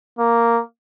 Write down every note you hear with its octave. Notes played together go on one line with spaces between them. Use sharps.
A#3